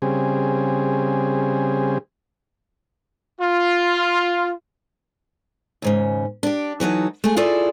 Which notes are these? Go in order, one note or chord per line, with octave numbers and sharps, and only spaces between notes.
C#3 G3 C4 G#4
F4
D#2 G#2 C#3
D4 G4
E3 F#3 D#4 A4
A3 G#4
E4 F4 G#4 A4 D5